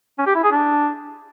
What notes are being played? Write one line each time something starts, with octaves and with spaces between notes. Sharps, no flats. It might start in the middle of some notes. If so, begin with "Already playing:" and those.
C#4
G4
E4
G#4
D4